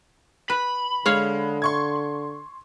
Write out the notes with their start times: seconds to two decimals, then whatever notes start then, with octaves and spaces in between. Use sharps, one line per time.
0.50 B4 B5
1.06 D3 G#3 C#5 F5
1.62 C6 C#6 G#6